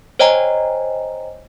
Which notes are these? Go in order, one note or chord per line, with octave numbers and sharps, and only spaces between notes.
C5 C#5 D#5 G5 G#5 A#5